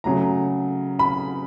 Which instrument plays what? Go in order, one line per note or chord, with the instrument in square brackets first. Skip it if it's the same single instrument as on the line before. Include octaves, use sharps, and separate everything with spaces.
[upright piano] C#3 F#3 A3 A#5
B5